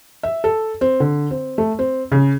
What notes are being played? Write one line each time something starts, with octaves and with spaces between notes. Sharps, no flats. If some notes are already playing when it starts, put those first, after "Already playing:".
E5
A4
C4
D3
C4
A3
C4
C#3